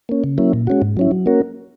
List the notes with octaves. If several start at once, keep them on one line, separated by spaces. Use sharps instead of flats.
A#3 C#4
C#3
F#3 A#3 C#4 E4
A#2
G#3 C#4 F#4
G#2
F#3 C#4 E4
F#3
A#3 C#4 F#4 A#4